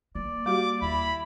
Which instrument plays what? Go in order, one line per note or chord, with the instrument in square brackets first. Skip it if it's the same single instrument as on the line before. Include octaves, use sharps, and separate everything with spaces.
[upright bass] A#3 [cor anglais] D5
[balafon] G3 F#4 G4 [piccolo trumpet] D6
[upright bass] D#2 [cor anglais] E4 [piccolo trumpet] B5